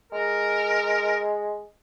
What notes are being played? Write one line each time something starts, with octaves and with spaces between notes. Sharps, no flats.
G#3 A#4